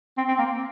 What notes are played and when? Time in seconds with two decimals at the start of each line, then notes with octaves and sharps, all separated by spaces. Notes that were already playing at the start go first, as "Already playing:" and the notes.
0.18 C4
0.28 C4
0.39 A#3